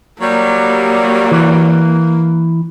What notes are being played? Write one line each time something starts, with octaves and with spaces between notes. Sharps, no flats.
F#3 G3 A#3
E3